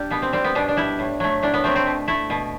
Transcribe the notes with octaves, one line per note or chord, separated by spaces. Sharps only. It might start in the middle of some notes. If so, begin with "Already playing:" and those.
Already playing: G3 D4
B2 B3
C4
G3 C4
B3
B2 D4
D4
G3 E4
A2
F#3 A3
A2 D4
B3
F#3 A3 C4
C4
B2
A3 E4
B2